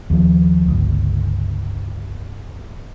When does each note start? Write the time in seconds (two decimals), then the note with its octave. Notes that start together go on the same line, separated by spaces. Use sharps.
0.10 D#2 F3
0.68 G1 C#2